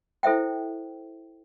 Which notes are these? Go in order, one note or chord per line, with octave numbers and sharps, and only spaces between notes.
E4 A4 C5 E5 G5